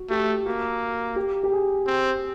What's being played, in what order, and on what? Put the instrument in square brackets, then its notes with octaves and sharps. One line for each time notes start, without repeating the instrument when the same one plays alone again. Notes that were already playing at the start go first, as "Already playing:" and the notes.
Already playing: [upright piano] F#4
[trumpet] A3 [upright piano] G4
[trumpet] A#3 [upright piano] F#4
[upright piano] G4
G4
G#4
[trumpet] C4